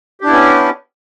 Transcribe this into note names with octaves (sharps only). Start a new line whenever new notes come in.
B3 C#4 D4 E4 G4